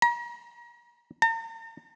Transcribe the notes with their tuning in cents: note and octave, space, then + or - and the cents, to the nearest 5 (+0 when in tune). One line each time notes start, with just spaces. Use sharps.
A#5 +35
A#5 -45